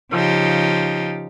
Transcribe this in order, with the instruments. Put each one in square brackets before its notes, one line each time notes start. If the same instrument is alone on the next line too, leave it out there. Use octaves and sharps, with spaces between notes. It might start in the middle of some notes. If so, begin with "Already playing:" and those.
[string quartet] C#3 F3 D#4 G4